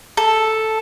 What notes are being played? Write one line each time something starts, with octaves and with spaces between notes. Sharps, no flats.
A4